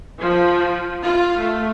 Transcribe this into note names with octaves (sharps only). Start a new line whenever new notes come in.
F3
F4
A3